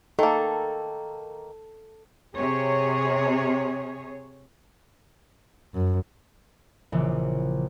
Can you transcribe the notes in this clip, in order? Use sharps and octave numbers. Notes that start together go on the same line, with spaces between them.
D#3 A#3 A4
C3 G#4 C#5
F#2
A#1 C#3 E3